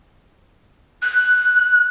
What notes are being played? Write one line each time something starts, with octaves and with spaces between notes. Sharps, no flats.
F#6